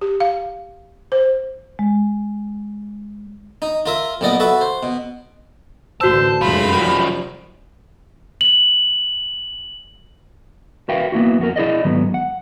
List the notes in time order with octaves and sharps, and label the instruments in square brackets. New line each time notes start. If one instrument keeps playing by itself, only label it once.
[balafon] G4
F5
C5
[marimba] G#3
[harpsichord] D#4
F4 A#4 E5
B1 A#2 B3 D5 D#5
F#4 A4 B4 E5
C5
B2
[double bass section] A1 D2 [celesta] F#4 E6 [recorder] C5 [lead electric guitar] A5
[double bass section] F1 F#2 G#3 [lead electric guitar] A3 F4 [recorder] B5
[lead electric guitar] F#2 D#3 [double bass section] F3 G3
[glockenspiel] F#7
[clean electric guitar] F#4 A#4 B4 E5 F5 G5
A#3 B3 E4 F#4
F2 F#4 A#4
E4 G#4 D5 D#5
G#2 D#3 F#3 B3
F#5